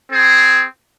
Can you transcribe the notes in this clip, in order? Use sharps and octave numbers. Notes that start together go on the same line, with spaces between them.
C4 G#4